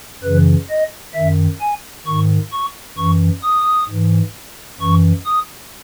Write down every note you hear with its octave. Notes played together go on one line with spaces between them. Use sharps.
F#2 C#3 E3 B4
D#5
F#2 D#3 E5
G#5
G#2 D#3 C#6
C#6
F#2 E3 C#6
D#6
G#2 E3
F#2 E3 C#6
D#6